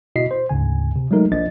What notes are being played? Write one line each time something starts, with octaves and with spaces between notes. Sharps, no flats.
B2 E4 F#4 D#5 B6 C7
C5
D2 G#2 C#3 G#5
C3
F#3 G#3 A3 D#4 A#4
B1 F3 A#3 D4 D#5 A6